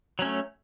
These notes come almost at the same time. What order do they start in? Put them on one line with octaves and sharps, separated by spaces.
F#3 C#4 A3